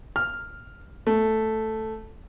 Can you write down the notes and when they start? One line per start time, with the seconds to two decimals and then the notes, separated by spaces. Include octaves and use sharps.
0.16 F6
1.07 A3